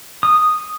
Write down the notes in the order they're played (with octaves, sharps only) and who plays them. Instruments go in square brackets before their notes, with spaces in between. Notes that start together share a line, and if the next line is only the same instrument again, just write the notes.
[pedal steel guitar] D#6